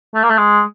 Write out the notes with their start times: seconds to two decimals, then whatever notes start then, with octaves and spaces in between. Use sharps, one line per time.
0.14 A3
0.23 A#3
0.30 A3
0.38 G#3